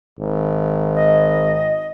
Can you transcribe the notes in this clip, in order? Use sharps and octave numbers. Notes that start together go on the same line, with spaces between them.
G#1
D#5